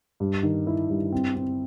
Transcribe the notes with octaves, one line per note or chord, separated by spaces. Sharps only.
G2
D#3
E4
G2
C4
C4